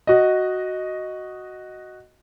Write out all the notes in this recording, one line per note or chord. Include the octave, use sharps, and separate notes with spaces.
F#4 D#5